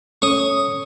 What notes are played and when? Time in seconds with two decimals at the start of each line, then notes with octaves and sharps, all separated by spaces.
0.22 C#4 A4 C#5 C#6 D#6